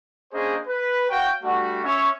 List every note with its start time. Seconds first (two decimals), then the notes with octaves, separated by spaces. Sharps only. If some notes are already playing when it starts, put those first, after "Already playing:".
0.33 A#3 C#4 D4 G#4 C5 D#5
0.67 B4
1.10 F#4 C#5 F5 G5
1.43 G3 A3 D4 F#4
1.84 C#4 C#5 E5